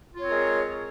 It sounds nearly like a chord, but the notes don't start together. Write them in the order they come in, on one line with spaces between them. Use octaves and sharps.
F4 C#5 C4 A#4 G#3